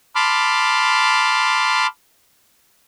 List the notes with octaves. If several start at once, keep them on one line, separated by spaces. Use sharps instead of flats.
A5 B5 C6 D6 F6